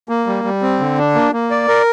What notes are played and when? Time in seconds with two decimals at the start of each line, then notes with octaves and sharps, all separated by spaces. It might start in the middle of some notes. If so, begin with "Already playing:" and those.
0.09 A#3
0.27 G3
0.44 G3
0.62 C4
0.80 D3
0.98 D4
1.15 A#3
1.33 A#3
1.50 D5
1.68 A#4